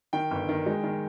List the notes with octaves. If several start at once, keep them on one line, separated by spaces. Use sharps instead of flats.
D#3 G5
G1
D#3
G#3
D#3